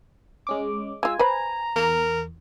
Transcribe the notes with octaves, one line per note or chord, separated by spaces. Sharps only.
G#3 C#4 D6
G#3 F4 G#5 E6
B4 C5 A#5 B5
E2 A#4